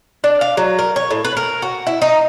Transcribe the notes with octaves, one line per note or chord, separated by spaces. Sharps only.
D4
F5
F#3
A#4
C#5
A2
B4
A#4
F#4
E4
D#4